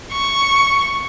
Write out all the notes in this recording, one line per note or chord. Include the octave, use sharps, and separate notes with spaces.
C#6